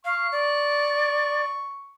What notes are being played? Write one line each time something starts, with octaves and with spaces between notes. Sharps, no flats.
F5 C#6
D5